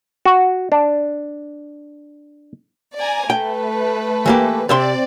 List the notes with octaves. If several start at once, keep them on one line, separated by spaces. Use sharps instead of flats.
F#4
D4
D5 G#5 A#5
A3 B4 G5
E3 A#3 G4
C3 C4 D5 E5 C6